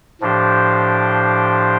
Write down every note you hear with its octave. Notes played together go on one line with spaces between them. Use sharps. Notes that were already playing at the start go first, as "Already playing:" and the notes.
A2 F3 D4 G4 C5